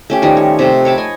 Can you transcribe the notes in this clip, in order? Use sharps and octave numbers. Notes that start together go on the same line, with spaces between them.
A3 C#4 G4
D#3 F3 G3 D#4
C#5
C3 A3
C#5 G5 A5 B5
D#5 G#5